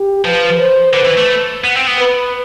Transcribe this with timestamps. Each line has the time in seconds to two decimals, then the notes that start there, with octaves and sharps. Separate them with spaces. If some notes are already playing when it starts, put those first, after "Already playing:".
Already playing: G4
0.25 F3 B4
0.59 C5
0.94 D3 B4
1.05 E3
1.18 A3
1.64 B3
1.76 C4
1.87 B3
1.99 B4